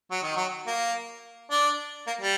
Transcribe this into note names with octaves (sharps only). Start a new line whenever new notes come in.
F#3
D#3
F#3
A#3
D4
A#3
G3